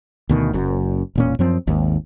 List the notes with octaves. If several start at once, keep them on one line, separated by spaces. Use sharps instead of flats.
D2 B2 D#3
F#1 F#2
E1 A#2 C#4
F#2 F3 C4
G#1 D#2